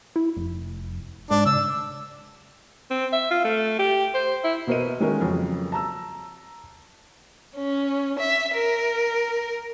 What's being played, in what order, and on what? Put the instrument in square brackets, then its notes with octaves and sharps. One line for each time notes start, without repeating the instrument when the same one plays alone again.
[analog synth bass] E4
F1
[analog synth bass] G#2 [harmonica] D4
[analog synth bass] C#3 [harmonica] E6
[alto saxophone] C4
E5
F4
A3
G4
C5
E4
[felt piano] B2 B3 A#4 C5 D#5 D#7
D#3 G#3 C#4 F#4 A4 A#4
F2 C#3 F#3 C#4
A5 A#5 E6
[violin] C#4
E5
A#4